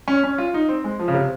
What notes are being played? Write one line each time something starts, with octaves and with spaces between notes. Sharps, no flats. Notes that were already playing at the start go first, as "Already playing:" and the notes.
C#4
C#4
F4
D#4
C4
G#3
F3
C#3
C3